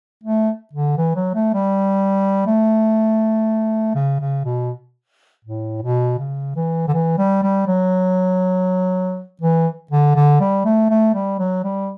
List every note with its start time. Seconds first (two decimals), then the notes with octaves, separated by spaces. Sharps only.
0.24 A3
0.73 D3
0.98 E3
1.16 F#3
1.35 A3
1.54 G3
2.47 A3
3.95 C#3
4.21 C#3
4.45 B2
5.45 A2
5.82 B2
6.18 C#3
6.56 E3
6.88 D3
6.94 E3
7.18 G3
7.43 G3
7.67 F#3
9.42 E3
9.92 D3
10.16 D3
10.41 G3
10.65 A3
10.90 A3
11.14 G3
11.39 F#3
11.64 G3